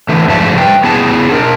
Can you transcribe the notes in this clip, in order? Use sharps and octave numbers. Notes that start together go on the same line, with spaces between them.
D3 E3 A3
G#2 D3 F3 E5 A5
B4 G5
B3 E4 G#4 A5
D4 A#4